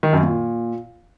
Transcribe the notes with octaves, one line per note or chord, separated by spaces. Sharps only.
D#3
F#2
A#2